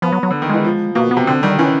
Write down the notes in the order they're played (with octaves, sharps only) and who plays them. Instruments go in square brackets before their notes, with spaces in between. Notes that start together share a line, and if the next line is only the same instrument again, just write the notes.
[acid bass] F3 [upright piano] B3
[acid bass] F#3
F#3
[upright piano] D3
D#3
[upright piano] E3 [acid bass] G#3
[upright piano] F3
[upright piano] B2 [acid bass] A#3
[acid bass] B3
[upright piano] C3
[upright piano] D3 [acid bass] C4
[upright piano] D#3 [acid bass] G3
[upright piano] E3 [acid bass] C#4